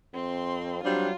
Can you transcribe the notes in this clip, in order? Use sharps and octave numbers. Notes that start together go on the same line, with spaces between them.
F2 C4 C6
F#3 G3 C4 D4 F4